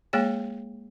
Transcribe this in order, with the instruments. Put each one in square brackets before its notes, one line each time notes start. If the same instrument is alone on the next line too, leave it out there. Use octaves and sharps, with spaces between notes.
[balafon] G#3 A#3 G#4 C#5 G5